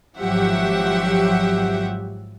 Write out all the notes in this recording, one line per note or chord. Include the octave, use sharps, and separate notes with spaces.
G#1 F3 F#3 G4 E5 F#5